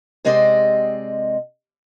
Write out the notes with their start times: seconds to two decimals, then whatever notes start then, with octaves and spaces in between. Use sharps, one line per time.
0.25 C3 G#3 C4 D5 D#5